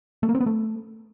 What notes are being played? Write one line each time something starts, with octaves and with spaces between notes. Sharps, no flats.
A3
A#3
C4
B3
A3